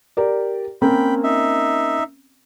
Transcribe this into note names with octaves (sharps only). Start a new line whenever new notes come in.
G4 A#4 D5
A#3 C4 C#4 G5 B5
D#4 E5